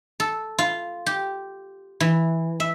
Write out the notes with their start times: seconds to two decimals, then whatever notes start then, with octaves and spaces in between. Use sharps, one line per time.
0.20 A4
0.58 F4
1.06 G4
2.00 E3
2.60 E5